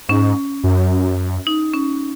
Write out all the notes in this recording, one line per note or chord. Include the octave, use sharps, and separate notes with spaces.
G#2 C#4
F#2
D#4
C#4